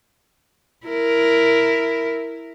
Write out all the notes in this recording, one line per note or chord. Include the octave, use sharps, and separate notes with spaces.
E4 A#4